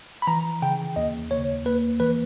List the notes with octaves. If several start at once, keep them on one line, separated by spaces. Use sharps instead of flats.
B5
E3 A#5
C#3 G5
D#2 D#5
D#2 C#5
A#3 B4
E3 B4